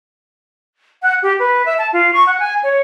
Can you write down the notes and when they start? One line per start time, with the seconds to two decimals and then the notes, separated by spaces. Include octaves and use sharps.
1.02 F#5
1.22 G4
1.39 B4
1.65 E5
1.78 A5
1.93 F4
2.13 C#6
2.27 F#5
2.39 G#5
2.63 C#5